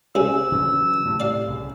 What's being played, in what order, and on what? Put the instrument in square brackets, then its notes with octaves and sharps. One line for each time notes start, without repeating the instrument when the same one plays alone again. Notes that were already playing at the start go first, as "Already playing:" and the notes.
[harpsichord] C#2 C3 G#4 [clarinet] E6
[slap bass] C#3 E3 F#3
A2 C3
[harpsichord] D5 F5
[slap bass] C2 C#3